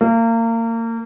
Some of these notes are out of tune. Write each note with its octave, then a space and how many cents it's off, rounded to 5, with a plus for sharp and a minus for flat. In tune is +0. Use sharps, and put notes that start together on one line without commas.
A#3 -30